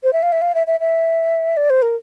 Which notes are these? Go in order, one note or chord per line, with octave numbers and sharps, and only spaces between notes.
C5
E5
F5
E5
F5
E5
E5
E5
D5
C5
A#4